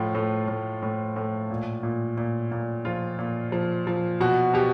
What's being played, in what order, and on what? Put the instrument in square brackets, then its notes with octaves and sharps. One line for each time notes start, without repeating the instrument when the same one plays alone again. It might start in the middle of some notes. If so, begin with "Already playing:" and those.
Already playing: [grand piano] A2 F3 F4
A2
A2
A2
A2
A#2
A#2
A#2
A#2
F3 F4
A#2
F3
F3
B2 F#4
B2 G4